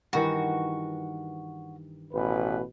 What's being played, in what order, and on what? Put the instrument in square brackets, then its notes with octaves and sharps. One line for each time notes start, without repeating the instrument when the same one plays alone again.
[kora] G2 D#3 E3 [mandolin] F#4
[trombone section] A1 B2 B4